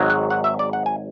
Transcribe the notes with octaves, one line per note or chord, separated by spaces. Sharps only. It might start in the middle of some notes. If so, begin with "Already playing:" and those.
Already playing: G#1 G#2 F#3
F#5
F#5
E5
D5
F#5
G#5